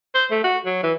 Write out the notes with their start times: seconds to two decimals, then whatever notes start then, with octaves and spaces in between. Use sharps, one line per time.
0.15 C5
0.31 A3
0.44 F#4
0.66 F#3
0.83 E3